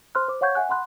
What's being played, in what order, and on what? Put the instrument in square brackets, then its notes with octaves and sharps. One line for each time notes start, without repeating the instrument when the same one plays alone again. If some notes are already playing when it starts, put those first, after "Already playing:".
[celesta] C5 C6 F6 F#6
C5 D6
C#5 F5 F#5 C#6 G6 G#6
E5 F#5 G#5 F#6
F#5 B5 C6 F#6